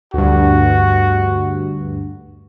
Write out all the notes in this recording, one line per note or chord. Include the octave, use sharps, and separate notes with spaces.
D2 G2 F#4